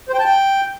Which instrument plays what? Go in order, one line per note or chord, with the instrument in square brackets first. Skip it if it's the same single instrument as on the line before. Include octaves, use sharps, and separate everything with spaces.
[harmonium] C5
G5
A5
G5